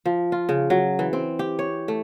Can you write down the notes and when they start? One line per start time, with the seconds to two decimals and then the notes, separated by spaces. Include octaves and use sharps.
0.05 F3
0.32 F4
0.49 C#3
0.70 F#3
0.99 E3
1.13 C4
1.39 G4
1.59 C#5
1.88 A3